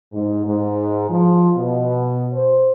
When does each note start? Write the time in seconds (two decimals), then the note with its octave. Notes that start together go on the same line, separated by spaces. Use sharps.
0.13 G#2
0.46 G#2
1.10 F3
1.56 B2
2.33 C5